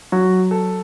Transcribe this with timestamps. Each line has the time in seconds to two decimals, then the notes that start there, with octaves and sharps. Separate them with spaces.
0.12 F#3 F#4
0.51 A4